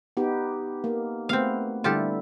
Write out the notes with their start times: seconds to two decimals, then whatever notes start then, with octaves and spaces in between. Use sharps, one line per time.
0.17 B3 D#4 G4
0.84 A#3
1.29 A3 B3 C4 F5
1.84 D3 G3 E4 F4 G4 A4